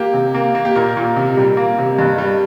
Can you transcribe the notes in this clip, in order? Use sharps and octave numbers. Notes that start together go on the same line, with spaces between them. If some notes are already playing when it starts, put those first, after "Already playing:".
Already playing: A#3 G4
C3
A#3
A#3
G4
A#2 A#4
A#2
C3
G3
A#3
C3
G2
G3